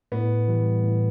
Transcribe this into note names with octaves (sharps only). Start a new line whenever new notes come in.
A2 B3
E3 G3
A2